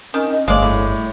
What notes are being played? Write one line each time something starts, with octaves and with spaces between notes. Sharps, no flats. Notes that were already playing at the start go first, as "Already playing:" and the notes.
D#3 C#4
D#5
G1 G#3 A3 C#5 D5 F5
A2